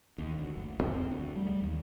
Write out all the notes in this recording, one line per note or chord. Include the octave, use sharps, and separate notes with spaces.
D#2
D2
F#1
F2
C4
D2
G3
G3
D#2